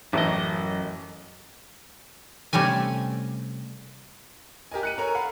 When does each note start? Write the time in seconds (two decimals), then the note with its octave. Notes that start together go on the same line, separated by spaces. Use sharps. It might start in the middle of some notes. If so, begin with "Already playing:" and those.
0.13 A1 F#2 D#5
2.53 C3 G3 A3 C#4 G#5
4.72 G4 A#4 D#5 G#5
4.83 F#6 C#7 D#7
4.98 A4 A#4 C#5 G#5 A#5
5.15 A#4 F5 F#5 B5